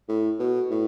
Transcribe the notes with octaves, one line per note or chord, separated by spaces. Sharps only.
A2
B2
A2